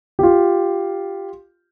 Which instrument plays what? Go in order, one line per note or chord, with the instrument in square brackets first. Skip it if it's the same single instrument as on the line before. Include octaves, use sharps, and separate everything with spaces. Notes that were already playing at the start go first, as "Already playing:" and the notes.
[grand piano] F4 G4